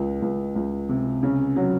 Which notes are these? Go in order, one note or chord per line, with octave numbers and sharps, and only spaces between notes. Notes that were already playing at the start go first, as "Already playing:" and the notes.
Already playing: C#2
C#2
C#2
C3
C#3
F#3